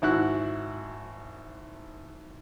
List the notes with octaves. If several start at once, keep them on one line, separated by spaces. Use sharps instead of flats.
G#1 E4 F#4 F#6